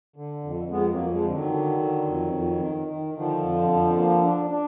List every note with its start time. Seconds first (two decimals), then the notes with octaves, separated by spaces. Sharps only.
0.16 D3
0.44 F2
0.71 F2 G#3 B3
0.91 F#3 A#3
0.97 F2
1.11 F3 G#3
1.25 D3
1.32 D#3 F#3
1.52 D3
1.79 D3
2.06 F2
2.34 F2
2.60 D#3
2.88 D#3
3.15 D3 D#3 F3
3.42 F2
3.70 F2
3.96 A#3
4.23 D4
4.50 D4